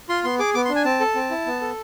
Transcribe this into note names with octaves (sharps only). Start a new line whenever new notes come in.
F4 C6
B3 C6
G#4 D6
B3 D6
C6
D4
G#5
C4 A5
A4
C4
E4
B3
A4